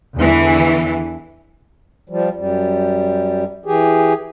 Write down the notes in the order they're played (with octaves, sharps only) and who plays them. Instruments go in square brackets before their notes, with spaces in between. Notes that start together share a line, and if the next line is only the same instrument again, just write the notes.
[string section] E2 D3 E3
[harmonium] F3 G3
F#2 G3
E3 G4 G#4